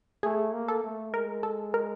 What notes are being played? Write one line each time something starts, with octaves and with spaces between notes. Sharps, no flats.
A3 G#4
A#3
A4
A3
G#3 A#4
A4
A#4